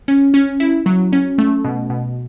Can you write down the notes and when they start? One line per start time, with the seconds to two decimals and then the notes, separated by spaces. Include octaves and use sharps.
0.08 C#4
0.34 C#4
0.60 E4
0.86 F#3
1.13 C#4
1.38 A3
1.65 B2
1.90 B2